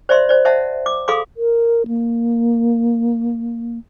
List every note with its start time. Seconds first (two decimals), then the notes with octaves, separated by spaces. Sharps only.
0.09 C5 D5 E5 B5 C6
0.29 C5 D5
0.45 C5 D#5 E5 F#5 A5
0.86 D6
1.08 G#4 A4 F5 B5 C6 D6
1.37 A#4
1.87 A#3